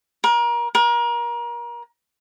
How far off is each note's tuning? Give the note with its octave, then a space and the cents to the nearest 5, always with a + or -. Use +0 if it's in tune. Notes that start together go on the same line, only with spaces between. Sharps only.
A#4 +30
A#4 +30